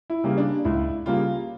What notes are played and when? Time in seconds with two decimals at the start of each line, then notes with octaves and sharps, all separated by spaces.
0.10 E4
0.24 C#3 G3 A#3
0.37 D4
0.64 C#2 E4
1.06 C#3 G3 A#3 F4